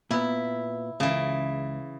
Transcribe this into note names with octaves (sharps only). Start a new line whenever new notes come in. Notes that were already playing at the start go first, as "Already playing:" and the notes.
A#2 B3 E4
C#2 C#3 E3